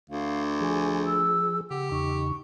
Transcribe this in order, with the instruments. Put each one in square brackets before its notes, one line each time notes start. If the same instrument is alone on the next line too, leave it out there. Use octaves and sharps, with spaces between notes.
[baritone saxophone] D2 [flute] F5
[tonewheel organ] F3 G#4 [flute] G#5
[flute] E6
[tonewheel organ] C#3 [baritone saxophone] G4 [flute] F#5
[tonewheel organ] E2 C#3 D#4 [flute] C#6